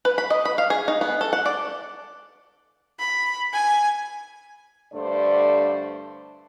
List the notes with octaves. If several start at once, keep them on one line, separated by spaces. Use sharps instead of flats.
B4
B5
D#5
B5
F5
G#4
D#4
B3
A4
F#5
D5
B5
G#5
G2 D3 A3 D4 C5 D5